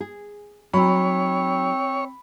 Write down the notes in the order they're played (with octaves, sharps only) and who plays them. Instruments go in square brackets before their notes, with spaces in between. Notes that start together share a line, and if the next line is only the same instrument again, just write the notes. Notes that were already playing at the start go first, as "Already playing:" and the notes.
[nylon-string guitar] G#4
[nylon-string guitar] F#3 D#4 [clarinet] C4 [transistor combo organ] C#5 [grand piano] B5